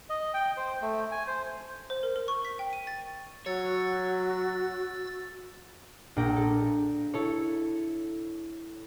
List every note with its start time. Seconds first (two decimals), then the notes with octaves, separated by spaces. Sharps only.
0.10 D#5
0.34 G5
0.57 C5
0.82 A3
1.11 G#5
1.27 C5
1.90 C5
2.03 A#4
2.16 A#4
2.28 C#6
2.45 B6
2.59 G5
2.73 D#7
2.87 A6
3.46 F#3 F#4 C#5 E6 A6
6.16 A#1 A#2 D4 G5 A#6 D7
6.36 A4
7.14 E4 A4 C#5